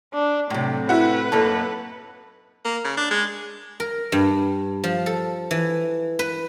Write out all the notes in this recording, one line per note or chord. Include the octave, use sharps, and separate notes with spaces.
D4
A2 C3 F#3
E4 F#4 B4
F#2 A#3 D#4 A4
A#3
C#3
D4
G#3
A#4
G2
F3
A4
E3
B4